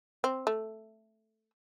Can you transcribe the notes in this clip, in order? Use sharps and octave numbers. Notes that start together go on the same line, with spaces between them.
C4
A3